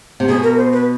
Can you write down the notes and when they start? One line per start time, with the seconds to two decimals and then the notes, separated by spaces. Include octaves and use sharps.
0.20 C3
0.28 B2 G#4
0.43 A#4
0.57 C5
0.72 B4